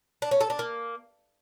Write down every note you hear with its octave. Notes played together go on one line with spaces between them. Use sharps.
D4
C#4
A4
D4
A#3